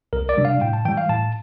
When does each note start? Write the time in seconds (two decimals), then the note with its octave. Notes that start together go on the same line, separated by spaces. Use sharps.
0.13 C2 A#4
0.29 D5
0.37 C3 G3 D4
0.45 F5
0.61 A2 G5
0.73 A5
0.85 E3 G3 G5
0.98 F5
1.09 A2 A5